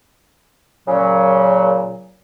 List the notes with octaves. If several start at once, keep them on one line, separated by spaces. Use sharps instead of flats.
A#2 C#3 F#3